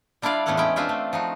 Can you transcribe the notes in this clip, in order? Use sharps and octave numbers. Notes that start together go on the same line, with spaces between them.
G3 D4 E4 F4 D5 F5
E2 A2 B3 C#4 A4 F#5
G#3 C#4 B4 G5
C4 D4 F4 E5 G5
A3
F3 D#4 F#4